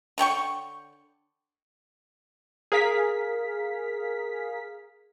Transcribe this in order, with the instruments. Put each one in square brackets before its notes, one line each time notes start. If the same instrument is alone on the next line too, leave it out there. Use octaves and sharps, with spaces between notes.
[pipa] D3 C#5 G5 C#6
[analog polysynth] G#4 A#4 F5 B6